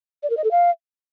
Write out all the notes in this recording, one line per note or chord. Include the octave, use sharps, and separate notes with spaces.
D5
A#4
D#5
A4
F5